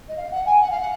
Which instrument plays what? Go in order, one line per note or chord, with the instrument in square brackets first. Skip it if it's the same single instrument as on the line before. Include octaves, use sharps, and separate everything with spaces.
[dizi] D#5
F5
F#5
G#5
F#5
F5
F#5